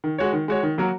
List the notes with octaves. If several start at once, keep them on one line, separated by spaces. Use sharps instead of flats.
D#3
G#3 F#4 C#5
D#3
G#3 F#4 C#5
D#3
F#3 A#3 F#4 A#4